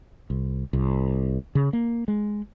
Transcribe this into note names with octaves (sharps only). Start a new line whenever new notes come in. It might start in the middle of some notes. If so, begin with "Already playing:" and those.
C2
C2
C#3
A#3
G#3